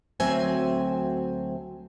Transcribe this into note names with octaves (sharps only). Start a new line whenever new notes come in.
D2 F#3 C4 E5 G#5